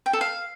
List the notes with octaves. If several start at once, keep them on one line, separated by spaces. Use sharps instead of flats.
G5
A4
F5